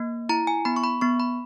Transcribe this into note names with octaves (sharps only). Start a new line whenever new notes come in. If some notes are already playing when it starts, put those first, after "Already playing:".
Already playing: A#3
E4 A#5
G#5
B3 B5
C#6
B5
B3 C#6
B5